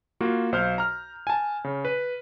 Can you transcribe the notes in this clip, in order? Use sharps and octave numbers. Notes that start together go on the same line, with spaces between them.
A#3 F4 F#4
B1 C5 F5 F6 G6
A#5 F6
G#5 A5
C#3
B4